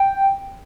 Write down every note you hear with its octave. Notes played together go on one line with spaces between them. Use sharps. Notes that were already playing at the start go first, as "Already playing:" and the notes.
Already playing: G5